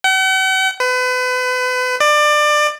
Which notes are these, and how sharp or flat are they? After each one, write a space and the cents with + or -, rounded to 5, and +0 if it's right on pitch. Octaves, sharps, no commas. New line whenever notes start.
F#5 +45
B4 +35
D5 +25